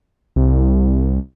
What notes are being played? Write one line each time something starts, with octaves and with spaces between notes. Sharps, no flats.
C2